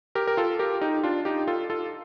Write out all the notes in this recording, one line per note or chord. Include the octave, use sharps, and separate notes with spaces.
G4 A#4
A#4
F4 A4
G4 A#4
D#4 G4
D4 F4
D#4 G4
F4 A4
F4 A4